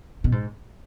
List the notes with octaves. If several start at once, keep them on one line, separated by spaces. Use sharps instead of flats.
B2
G#2